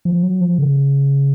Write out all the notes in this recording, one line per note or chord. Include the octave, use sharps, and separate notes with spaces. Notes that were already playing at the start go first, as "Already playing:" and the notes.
F3
F#3
F3
C#3